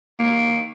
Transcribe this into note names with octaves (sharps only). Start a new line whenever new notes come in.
A#3